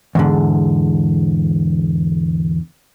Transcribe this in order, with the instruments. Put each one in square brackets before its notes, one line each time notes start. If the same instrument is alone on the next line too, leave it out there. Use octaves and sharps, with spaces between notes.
[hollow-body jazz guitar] E2 G#2 D3